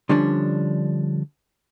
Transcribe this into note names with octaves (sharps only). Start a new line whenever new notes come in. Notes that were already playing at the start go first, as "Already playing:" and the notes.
D3 F3 G3 C#4 D4